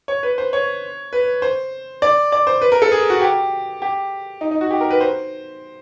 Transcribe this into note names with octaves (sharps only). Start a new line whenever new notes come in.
C#5
B4
C5
C#5
B4
C5
D5
D5
C5
B4
A#4
A4
G#4
F#4
G4
G4
D#4
D#4
F#4
G4
A#4
B4
C5